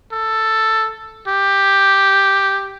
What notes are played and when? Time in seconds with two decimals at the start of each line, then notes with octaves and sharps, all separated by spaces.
0.12 A4
1.28 G4